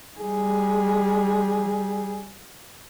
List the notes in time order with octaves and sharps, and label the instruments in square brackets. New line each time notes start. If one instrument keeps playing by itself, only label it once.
[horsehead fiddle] G3 G#4